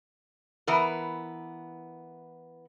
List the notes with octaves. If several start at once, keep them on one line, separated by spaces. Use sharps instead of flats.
E3 B3 A#4